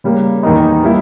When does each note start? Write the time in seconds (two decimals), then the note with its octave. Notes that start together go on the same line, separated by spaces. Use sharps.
0.04 C#3 G3 A#3
0.43 E2 D#3 A#3 D#4
0.84 G3 A#3 E4